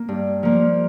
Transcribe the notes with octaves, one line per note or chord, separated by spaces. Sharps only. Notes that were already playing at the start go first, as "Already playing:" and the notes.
Already playing: A#3
G2
F3 A#3